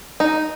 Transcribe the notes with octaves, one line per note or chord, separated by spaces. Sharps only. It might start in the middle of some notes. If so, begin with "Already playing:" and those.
D#4